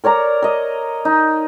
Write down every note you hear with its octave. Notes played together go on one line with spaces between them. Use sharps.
A#4 C#5 D5 A#5
A#4 D#5
D#4